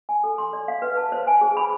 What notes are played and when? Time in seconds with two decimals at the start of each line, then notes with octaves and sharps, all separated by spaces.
0.09 G#5
0.24 A4
0.38 C6
0.53 D5
0.68 F5
0.82 B4
0.97 A5
1.12 C5
1.27 G#5
1.41 G#4
1.57 B5